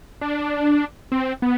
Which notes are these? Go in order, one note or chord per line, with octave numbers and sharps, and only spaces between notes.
D4
C4
B3